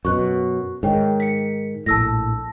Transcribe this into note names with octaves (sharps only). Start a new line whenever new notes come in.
F#2 B2 C#6 F#6
G#2 D#3 C#5 G5
B6 C#7
A#1 A2 A5 E6 A#6